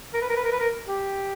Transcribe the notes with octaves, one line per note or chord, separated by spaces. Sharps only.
A#4
B4
A#4
B4
A#4
B4
A#4
G4